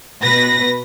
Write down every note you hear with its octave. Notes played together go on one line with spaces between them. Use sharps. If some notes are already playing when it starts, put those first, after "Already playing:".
B2 B4 A#6